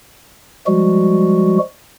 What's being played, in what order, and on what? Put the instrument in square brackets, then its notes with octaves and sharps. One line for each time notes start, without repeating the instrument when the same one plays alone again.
[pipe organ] F3 G3 G#3 F#4